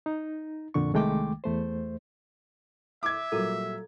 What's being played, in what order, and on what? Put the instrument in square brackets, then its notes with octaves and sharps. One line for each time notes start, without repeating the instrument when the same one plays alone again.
[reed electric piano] D#4
F2 A#2 D3 D4 C#6
C2 D#3 G#3 A3 G5 D6
E2 A3 C5
[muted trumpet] E5 [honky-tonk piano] D6 G#6
[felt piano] A#2 F#3 G3 [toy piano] A4